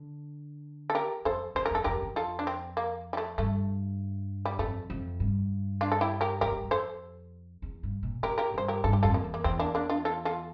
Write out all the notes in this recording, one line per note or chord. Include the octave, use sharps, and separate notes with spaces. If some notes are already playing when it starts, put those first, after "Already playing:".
Already playing: D3
A4
G4 A#4
F2 A4 C5
E2 C5
A#4
F2 A4
F2 G4 A#4
F2
F4 A4
D4
C4
A#3
G3
A3
G2 A3
G3
F2 A3
F2
G2
D4 F4
A4
E4 G4
G4 A#4
F2 G4 A#4
G2
F2
A4 C5
E2
G2
A#2
A2 G4 A#4
G4 A#4
G2 C5
G4 A#4
G2 A4
G4
F2 F4 A4
A#3
E2
A#3
E2 C4
A#3 D4
A#3 D4
D4 F4
F4 A4
F4 A4